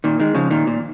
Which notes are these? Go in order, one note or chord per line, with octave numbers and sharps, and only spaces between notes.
A#2 D#3
D#3 G#3
C#3 F3
A#2 D#3
A#2